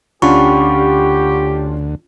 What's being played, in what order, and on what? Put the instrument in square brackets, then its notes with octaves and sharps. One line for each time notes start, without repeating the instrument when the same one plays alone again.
[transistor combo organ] D2 [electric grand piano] C#4 D4 F4 [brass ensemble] G4 [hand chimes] F#5 B5 C#6